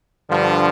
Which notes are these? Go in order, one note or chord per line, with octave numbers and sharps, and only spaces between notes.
G2 D3 F3